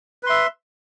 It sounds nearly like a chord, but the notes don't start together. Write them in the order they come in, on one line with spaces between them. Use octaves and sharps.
B4 C6 E5